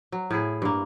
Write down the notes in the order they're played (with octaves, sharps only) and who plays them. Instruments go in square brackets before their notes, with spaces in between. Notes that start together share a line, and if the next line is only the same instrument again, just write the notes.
[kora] F#3
A2 E4 G#4
G2 A#3